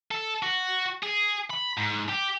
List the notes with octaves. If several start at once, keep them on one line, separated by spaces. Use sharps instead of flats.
A4
F#4
G#4
B5
G#2
G4